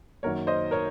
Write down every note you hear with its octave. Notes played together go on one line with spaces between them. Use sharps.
F#2 D#3 F#3 A#3 A#4 C#5
C5 D#5
A#4 C#5